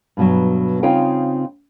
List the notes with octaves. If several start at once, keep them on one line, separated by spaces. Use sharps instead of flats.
G2 B2 F#3
C#3 C4 D#4 F4 C#5 G5